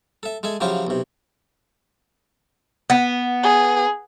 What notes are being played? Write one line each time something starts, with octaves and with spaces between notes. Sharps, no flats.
A4 E5
G#3 A4 E5 G#5
C#3 F3 F#3 E4 F4 G4
B1 C3
B3
G#4